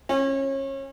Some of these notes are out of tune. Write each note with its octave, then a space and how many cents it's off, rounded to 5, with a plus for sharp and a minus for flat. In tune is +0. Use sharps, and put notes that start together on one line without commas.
C#4 -30